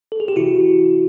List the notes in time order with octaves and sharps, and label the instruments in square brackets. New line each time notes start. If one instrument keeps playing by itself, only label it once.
[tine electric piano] A4
G#4
G4
C3 E3 E4 F#4